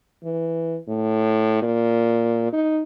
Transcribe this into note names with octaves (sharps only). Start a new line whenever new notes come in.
E3
A2
A#2
D#4